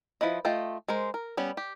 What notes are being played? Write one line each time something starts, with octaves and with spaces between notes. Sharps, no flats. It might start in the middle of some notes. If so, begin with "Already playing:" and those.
F3 E4 B4 D#5
A3 F4 D#5 G5
G#3 A#4 C5
A#4
G3 B3 C#4
G4